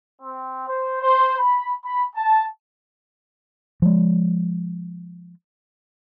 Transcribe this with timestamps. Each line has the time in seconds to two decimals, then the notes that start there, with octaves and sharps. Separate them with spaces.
0.22 C4
0.67 C5
1.01 C5
1.38 B5
1.84 B5
2.15 A5
3.82 F3 G#3